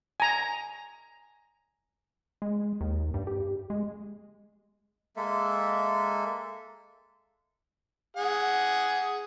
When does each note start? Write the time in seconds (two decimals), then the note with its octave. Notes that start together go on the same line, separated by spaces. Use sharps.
0.20 G#5 A#5
2.42 G#3
2.81 D#2
3.14 G2
3.27 G4
3.70 G#3
5.16 G#3 A#3 A4 E5
8.16 G#4 F#5